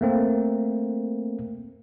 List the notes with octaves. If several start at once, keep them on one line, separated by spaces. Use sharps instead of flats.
A3 A#3 C4